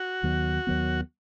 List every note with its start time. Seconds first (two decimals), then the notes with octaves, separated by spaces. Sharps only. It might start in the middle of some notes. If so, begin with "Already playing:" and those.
Already playing: F#4
0.23 D#2 D#3 F#3 B3
0.67 D#2 D#3 F#3 B3